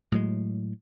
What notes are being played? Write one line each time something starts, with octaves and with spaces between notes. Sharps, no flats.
A2 F#3 G#3